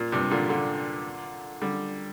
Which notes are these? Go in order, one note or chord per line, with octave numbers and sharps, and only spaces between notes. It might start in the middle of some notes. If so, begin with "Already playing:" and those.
Already playing: A#2
G2 C3
A#2 D3
A#2 D3
D3 G3